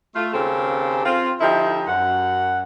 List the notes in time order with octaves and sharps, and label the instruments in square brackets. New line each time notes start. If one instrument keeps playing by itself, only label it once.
[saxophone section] A3 F4
D#2 C#3 A#3 C4 A4
C4 F4
D3 F3 D#4 E4 G4 E5
F#2 F#5